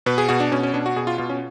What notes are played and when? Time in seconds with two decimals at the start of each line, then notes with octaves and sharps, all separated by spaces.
0.06 B2 B4
0.18 G#4
0.29 B2 F#4
0.40 D4
0.52 B2 C#4
0.63 C#4
0.73 B2 D4
0.86 F#4
0.96 B2 G#4
1.07 F4
1.18 B2 F4
1.30 C#4